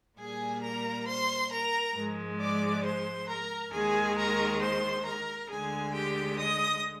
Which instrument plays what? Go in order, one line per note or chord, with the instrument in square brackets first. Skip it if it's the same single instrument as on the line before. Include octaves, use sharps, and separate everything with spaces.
[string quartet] A#2 G3 A#3 G#4 G#5
A#4 A#5
C5 C6
A#4 A#5
G#2 F3 G#3
D5 D6
C5 C6
A#4 A#5
D#2 D#3 G#3 G#4 G#5
A#4 A#5
C5 C6
A#4 A#5
D2 D3 G#3 G#4 G#5
G4 G5
D#5 D#6